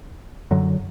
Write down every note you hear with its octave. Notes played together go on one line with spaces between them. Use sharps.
F#2 D3 F#3